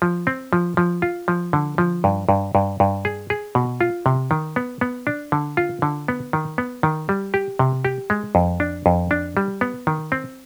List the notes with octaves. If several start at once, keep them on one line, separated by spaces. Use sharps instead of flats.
F3
C4
F3
F3
F4
F3
D3
F3
G2
G2
G2
G2
G#4
G#4
B2
F4
C3
D#3
B3
B3
D4
D3
F4
D3
B3
D#3
B3
D#3
G3
G4
C3
G4
G#3
F2
D4
F2
D4
G3
B3
D#3
C4